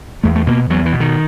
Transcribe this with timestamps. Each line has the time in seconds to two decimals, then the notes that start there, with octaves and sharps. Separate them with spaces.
0.23 E2 A3
0.36 A3
0.47 B2 A#3
0.70 E2 F#3
0.86 E3
0.92 B2
1.00 D#3